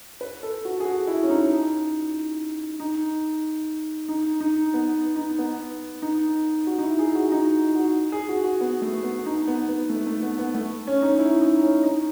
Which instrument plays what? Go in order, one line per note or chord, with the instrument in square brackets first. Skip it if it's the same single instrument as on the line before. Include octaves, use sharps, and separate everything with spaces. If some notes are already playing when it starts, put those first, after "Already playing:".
[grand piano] B4
A4
F#4
G#4
F#4
E4
C#4
D#4
D#4
D#4
D#4
B3
D#4
B3
D#4
F#4
D#4
E4
G#4
F#4
D#4
F#4
G#4
F#4
F#4
B3
A3
B3
D#4
B3
B3
A3
A3
B3
B3
A3
C#4
D#4
E4
D#4
C#4
D#4